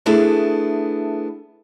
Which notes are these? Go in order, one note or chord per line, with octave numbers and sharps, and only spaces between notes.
A3 B3 D4 E4 G#4 A4